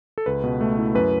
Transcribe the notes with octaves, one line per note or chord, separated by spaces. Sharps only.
A4
C#2 B4
B2
A3
E4
F#2 B4